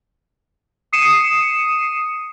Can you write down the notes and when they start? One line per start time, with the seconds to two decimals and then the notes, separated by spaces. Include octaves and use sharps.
0.93 D#6 C7 C#7 D#7 E7